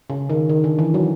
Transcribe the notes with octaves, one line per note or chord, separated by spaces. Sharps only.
C#3
D#3
D#3
D3
E3
F#3